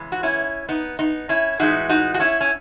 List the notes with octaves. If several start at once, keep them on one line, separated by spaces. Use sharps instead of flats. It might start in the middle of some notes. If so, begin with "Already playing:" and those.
Already playing: C#3 E3 G#3 B3
F#4
C#4 E4
B3 D#4
B3 D#4
C#4 E4
A2 E3 G#3 B3 D#4 F#4
D#4 F#4
F#4
C#4 E4
C#4